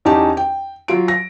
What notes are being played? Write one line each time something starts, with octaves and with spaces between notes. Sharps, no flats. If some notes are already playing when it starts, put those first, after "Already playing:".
E2 C#4 D#4 G4 A5
G5
F#3 F4 D7
A#6